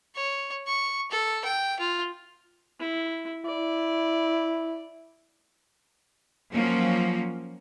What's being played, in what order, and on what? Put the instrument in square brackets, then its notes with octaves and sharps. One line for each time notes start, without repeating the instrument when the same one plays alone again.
[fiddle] C#5
C#6
A4
G5
F4
[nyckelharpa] E4
[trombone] E4 [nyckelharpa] D5
[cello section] F3 F#3 A#3 C#4